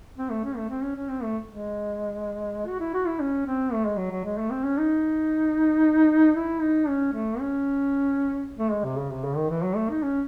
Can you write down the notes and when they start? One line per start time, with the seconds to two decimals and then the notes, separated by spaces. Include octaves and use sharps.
0.18 C4
0.30 A3
0.44 C#4
0.57 A3
0.70 C4
0.83 C#4
0.96 C#4
1.09 C4
1.23 A3
1.49 G#3
2.67 F#4
2.80 E4
2.94 F#4
3.07 E4
3.20 C#4
3.46 C4
3.73 A3
3.85 G#3
3.98 F#3
4.11 F#3
4.25 G#3
4.38 A3
4.50 C4
4.64 C#4
4.78 D#4
6.35 E4
6.61 D#4
6.88 C#4
7.13 A3
7.40 C#4
8.58 A3
8.72 G#3
8.84 C3
8.98 C#3
9.11 C3
9.24 C#3
9.36 D#3
9.50 E3
9.63 F#3
9.76 A3
9.90 D#4
10.03 C#4